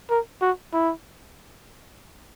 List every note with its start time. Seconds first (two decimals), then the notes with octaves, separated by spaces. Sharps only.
0.10 A#4
0.42 F#4
0.73 E4